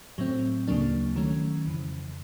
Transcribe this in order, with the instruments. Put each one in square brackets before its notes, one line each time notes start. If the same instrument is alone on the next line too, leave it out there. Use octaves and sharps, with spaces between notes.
[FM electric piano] A2 F#3 A3 C4
D2 C#3 F#3 A#3 D4
D#3 F#3 A3 C#4
F2 C#3 E3